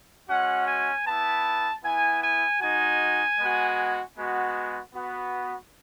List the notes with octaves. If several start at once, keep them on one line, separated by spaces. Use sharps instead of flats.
G#3 C#4 F#4 F#5
G#5
B3 E4 A5
B3 E4 G#5
G#5
G#3 D#4 F#4 G#5
G#3 B3 F#4
G#3 B3 F#4
B3 F#4